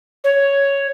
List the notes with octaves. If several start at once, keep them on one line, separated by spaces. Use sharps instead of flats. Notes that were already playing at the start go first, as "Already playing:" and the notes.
C#5